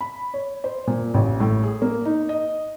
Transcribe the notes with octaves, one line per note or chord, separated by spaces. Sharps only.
B5
C#5
C5
A#2
A1
A2
G#4
A#3
D#4
D#5